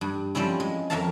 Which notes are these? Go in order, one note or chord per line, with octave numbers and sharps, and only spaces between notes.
G2
F3 G3 C4 C#4 E4
G#3
F2 A#4 C#5 E5 F5 A5